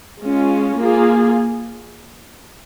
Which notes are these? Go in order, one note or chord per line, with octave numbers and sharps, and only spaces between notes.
G#3 C#4 F4
A#3 F4 G#4